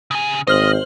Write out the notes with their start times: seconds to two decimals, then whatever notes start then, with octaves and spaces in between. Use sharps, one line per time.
0.11 C#3 G#5
0.47 G#1 C5 D#5 F6 F#7